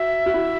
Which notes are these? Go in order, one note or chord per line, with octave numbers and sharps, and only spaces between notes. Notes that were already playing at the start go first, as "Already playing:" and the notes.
Already playing: F#4 E5
F#4
E4